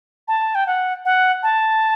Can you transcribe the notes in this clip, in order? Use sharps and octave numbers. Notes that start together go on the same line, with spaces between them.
A5
G5
F#5
F#5
A5